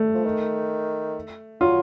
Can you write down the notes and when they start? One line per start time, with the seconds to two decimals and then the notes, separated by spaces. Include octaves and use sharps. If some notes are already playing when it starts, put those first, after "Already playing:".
Already playing: A3
0.15 F3
0.25 D#3
1.61 F#3 F4